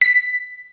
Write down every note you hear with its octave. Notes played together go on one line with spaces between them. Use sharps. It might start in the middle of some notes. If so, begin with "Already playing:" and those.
B6